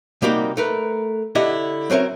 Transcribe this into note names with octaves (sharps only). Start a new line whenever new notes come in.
C3 G3 A#3 D#4 F#4 G4
A3 A#4 B4
D3 E4 G4 D#5 F#5
F#3 C4 C#4 A#4 E5